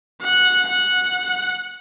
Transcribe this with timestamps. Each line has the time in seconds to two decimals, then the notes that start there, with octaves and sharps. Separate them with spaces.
0.22 F#5
0.68 F#5